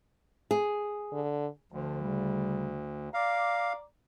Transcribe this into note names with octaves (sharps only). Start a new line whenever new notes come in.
G#4
D3
D2 D3 F3
C#3 G3
D5 F5 A#5 D6